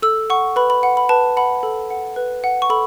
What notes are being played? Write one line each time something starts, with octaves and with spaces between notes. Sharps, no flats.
A4 E6
F#5 C#6
B4 B5
B5
F#5
B5
B4 A5
F#5 B5
A4
F#5
B4
F#5
C#6
A4 B5